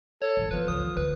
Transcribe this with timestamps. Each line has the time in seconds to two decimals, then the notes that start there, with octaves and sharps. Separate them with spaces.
0.22 A4 C#5
0.37 A1 F2
0.51 E3 F3 B3 B4
0.68 C#2 D#6
0.79 D#3
0.97 D2 B4